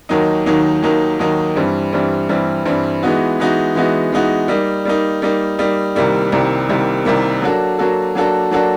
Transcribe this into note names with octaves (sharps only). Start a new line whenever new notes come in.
D#2 D#3 F#3 A#3 D#4
D#2 D#3 F#3 A#3 D#4
D#2 D#3 F#3 A#3 D#4
D#2 D#3 F#3 A#3 D#4
G2 E3 G3 C4
G2 E3 G3 C4
G2 E3 G3 C4
G2 E3 G3 C4
E3 G#3 B3 D#4 F#4
E3 G#3 B3 D#4 F#4
E3 G#3 B3 D#4 F#4
E3 G#3 B3 D#4 F#4
G3 A#3 D#4
G3 A#3 D#4
G3 A#3 D#4
G3 A#3 D#4
C2 C3 D#3 G3 A#3
C2 C3 D#3 G3 A#3
C2 C3 D#3 G3 A#3
C2 C3 D#3 G3 A#3
F#3 A#3 D4 F#4 A4
F#3 A#3 D4 F#4 A4
F#3 A#3 D4 F#4 A4
F#3 A#3 D4 F#4 A4